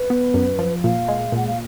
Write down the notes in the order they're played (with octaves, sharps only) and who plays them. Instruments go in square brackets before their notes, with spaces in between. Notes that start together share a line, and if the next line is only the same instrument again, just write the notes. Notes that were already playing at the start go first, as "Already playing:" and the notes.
Already playing: [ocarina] B4
[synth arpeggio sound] B3
F#2
F3
[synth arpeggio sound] A#2 [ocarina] F5
[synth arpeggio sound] G#3
[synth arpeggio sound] A#2 [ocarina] F#5
[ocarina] F5